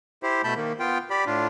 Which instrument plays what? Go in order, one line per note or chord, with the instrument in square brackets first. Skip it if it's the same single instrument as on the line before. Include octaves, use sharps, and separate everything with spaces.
[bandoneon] E4 G4 C5
B2 A3 A5 B5 G6
D#3 A#3
B3 F4 G5
G4 D5 B5
A2 D4 F4